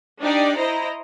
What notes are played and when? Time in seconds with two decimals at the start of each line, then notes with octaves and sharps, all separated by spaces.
0.21 D4 D#4 G4 D5
0.58 E4 C5 D#5 A#5